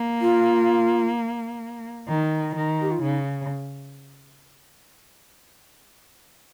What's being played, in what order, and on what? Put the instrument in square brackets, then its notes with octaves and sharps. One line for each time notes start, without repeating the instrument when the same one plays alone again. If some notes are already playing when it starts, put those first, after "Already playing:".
Already playing: [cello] A#3
[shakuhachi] F4
[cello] D#3
D#3
[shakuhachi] G4
F4
[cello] C#3 [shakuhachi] D#4